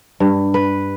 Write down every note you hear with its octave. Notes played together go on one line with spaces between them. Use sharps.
G2
B4